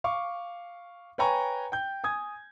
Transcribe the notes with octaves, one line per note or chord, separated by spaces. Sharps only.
F5 C#6 D6
B4 C#5 G5 G#5 A#5 C#6
G5 G6
G#5 D#6 G#6